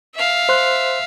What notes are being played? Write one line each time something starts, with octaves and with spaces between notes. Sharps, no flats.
E5 F5
C5 C6 F#6